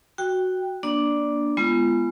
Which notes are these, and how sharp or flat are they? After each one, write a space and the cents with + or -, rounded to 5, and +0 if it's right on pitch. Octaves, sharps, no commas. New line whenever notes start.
F#4 +0 G5 +0
A#3 +30 D4 +0 D5 +0
G#3 +0 B3 +0 F4 -35